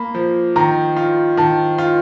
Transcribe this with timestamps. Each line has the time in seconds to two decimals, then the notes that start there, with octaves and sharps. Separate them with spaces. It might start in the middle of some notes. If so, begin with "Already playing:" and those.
Already playing: A#3 B5
0.15 F3
0.56 D#3 A#5
0.97 F4
1.37 D#3 A5
1.78 F4